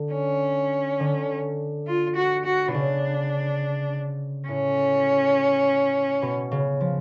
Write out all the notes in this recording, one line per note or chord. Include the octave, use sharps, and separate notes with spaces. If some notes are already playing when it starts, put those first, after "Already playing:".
Already playing: D3
C#4
D3
F4
F#4
F#4
B2
C#3 D4
A2 C#4
B2
C#3
F3